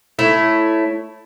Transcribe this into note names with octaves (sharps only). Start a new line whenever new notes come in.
A3 E4 C#5